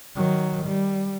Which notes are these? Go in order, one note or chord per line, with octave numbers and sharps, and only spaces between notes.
D#3 F#3
G3